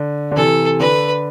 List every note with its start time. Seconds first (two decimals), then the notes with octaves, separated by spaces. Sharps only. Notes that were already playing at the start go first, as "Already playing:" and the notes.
Already playing: D3
0.31 D3
0.36 C3 E3 A4
0.80 D3 B4